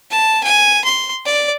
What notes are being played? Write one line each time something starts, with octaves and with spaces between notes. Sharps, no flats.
A5
G#5
C6
D5